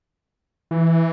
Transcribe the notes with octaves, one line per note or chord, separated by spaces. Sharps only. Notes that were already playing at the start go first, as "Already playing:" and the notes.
E3